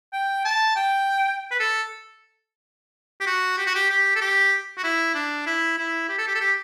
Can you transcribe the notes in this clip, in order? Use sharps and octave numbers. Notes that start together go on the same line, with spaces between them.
G5
A5
G5
B4
A4
G4
F#4
G4
F#4
G4
G4
A4
G4
F#4
E4
D4
E4
E4
G4
A4
G4
A4
G4